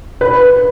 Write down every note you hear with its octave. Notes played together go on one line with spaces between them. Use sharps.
B4